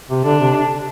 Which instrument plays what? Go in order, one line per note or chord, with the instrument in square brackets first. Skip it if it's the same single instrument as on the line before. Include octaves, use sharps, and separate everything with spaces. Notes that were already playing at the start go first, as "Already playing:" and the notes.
[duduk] C3
[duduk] D3 [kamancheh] D4
[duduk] C3